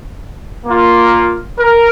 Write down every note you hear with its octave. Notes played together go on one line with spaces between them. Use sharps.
A#3 F4
A#4